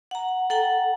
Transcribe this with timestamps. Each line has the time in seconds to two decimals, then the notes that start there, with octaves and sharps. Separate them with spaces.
0.11 F#5 A#5
0.50 A4 F#5 G5 A#5